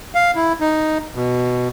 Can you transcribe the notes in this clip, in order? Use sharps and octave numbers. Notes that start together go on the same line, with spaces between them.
F5
E4
D#4
B2